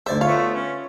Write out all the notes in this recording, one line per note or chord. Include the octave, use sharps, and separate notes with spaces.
D2 C5 D5 E5
A3 B3 F4 C#5 F5
C#4